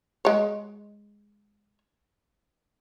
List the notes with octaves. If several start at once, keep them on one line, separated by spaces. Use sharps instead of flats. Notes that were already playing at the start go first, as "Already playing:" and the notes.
G#3 C#5